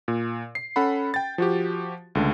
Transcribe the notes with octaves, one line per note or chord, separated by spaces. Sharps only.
A#2
C7
C#4 A4 F#5 B5
G5 A6
F3 F#4 G4
C#2 D3 A3